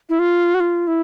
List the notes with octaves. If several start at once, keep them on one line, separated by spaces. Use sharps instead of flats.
E4
F4
F#4
F4
E4